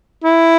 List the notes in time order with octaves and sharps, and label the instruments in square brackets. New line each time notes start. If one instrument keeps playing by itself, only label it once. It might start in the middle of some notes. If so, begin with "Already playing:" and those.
[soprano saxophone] E4